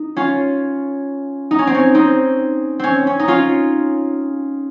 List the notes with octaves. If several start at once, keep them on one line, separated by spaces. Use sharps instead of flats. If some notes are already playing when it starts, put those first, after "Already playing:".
Already playing: D#4
C#4 F4
D#4
C#4
C4
C#4
C4 D#4
C4 C#4
C#4
D#4
C#4 F4